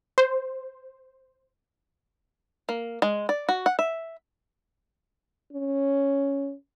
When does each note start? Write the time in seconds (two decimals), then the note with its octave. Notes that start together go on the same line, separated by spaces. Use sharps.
0.18 C5
2.69 A#3
3.02 G#3
3.29 D5
3.49 F#4
3.66 F#5
3.79 E5
5.53 C#4